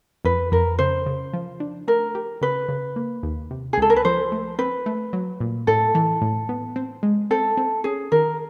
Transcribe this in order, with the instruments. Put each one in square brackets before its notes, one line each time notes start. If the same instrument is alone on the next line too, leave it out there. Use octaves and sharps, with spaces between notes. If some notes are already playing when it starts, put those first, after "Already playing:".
[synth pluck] F2 [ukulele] B4
[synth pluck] F2 [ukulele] A#4
[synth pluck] C#3 [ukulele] C5
[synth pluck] C#3
F3
D4
[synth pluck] A3 [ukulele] A#4
[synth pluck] G4
[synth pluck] C#3 [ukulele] B4
[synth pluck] C#3
A#3
D#2
C3
[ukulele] G#4
[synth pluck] C#2 [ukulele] A4
[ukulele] A#4
B4
[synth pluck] F3 [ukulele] C5
[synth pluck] A3
[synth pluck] C4 [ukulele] B4
[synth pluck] A3
F#3
A#2
[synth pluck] A2 [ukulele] A4
[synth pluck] E3
A2
B3
C4
G#3
[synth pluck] C4 [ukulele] A4
[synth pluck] C4
[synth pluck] C#4 [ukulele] G#4
[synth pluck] D#3 [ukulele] A#4